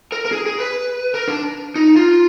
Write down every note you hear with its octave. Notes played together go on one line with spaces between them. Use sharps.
A#4
A#4
G#4
G#4
B4
A#4
D4
D#4
F4